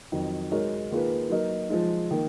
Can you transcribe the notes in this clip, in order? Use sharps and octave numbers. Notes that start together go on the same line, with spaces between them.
F2 D#3 F#3
G#3 D#4 F#4 A#4 C#5
D#3 A#3 F4 G#4 B4
F#3 A#3 D#4 F#4 A#4
F3 G#3 D#4
D#3 A#3